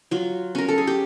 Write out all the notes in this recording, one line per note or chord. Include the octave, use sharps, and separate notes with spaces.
F#3 F4
C#4 A#4
A4
G#4
G4